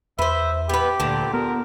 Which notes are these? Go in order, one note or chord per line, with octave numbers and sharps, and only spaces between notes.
E2 B4 C5 E5
B3 G4 B4
D2 A#2 D3 A5
B3 A#4